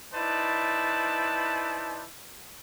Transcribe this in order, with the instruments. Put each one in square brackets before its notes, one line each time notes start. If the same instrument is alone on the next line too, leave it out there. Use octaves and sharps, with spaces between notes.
[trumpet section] D#4 E4 B4 C5 D5 A5